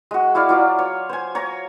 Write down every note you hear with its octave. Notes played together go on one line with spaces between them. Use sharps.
G#3 F#4
E4 F#4 D5 F5
F#3 F4 D5
C#5
C5 G#5
C#5 A#5